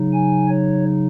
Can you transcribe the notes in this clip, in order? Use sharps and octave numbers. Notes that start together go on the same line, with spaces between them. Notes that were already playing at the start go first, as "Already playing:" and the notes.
Already playing: C#3 F#3 D#4
G#5
C#5